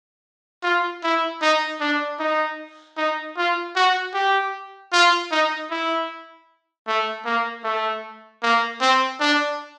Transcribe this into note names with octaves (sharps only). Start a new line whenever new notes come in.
F4
E4
D#4
D4
D#4
D#4
F4
F#4
G4
F4
D#4
E4
A3
A#3
A3
A#3
C4
D4